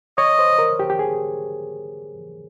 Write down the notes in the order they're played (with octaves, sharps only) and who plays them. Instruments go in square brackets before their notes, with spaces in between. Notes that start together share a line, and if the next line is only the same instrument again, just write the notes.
[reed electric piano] C#5 [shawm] D#5
[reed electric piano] C5
A#4
G4
G4
G#4